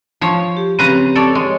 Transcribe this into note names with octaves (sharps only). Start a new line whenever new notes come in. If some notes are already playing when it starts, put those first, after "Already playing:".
F3 C#5
G4
C#3 C4 G4 B4 A#5
A4 C#5 D5
G#3 C#5